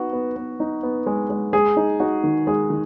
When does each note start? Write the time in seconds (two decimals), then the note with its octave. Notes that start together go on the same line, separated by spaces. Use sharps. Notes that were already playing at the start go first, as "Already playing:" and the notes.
Already playing: B3 D#4 F#4
0.13 B3
0.36 B3
0.60 D#4
0.83 B3
1.06 G#3
1.30 G#3
1.53 G#3 G#4
1.77 D#4
2.00 D#4 F#4
2.24 D#3
2.47 G#3 G#4
2.70 D#3